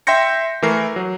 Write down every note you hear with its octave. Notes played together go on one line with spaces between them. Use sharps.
E5 G5 C6 G6 A#6 C#7
E3 A3 A#4 C7
F#3